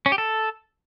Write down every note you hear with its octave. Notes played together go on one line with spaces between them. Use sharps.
C#4
G4
A4